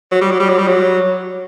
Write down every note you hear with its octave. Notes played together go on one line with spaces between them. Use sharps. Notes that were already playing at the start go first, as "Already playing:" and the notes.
F#3
G3
F#3
G3
F#3
G3
F#3